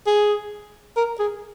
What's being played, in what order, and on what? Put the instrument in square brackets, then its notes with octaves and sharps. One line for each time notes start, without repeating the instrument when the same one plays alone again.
[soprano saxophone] G#4
A#4
G#4